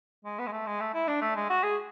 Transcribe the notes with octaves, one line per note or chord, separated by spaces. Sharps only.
G#3
B3
G#3
A3
G#3
A3
E4
D4
A3
G#3
F#4
G#4